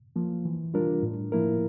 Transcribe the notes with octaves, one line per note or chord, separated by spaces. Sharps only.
F3 A#3
E3
G3 D4 F4 A#4
A2
F3 A#3 E4 A#4